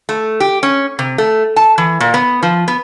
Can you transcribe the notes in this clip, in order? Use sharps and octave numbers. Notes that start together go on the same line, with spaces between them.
A3
G4
C#4
C3
A3
A5
E3
A#2
B3
F3
B3